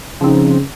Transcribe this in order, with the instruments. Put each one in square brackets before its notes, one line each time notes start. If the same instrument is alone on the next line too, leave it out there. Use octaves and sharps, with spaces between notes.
[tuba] C#3 [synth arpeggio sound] F3 C4 D#4